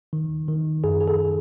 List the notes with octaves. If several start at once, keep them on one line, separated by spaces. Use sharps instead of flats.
D#3
D#3
F#2 G#4
G#4
A4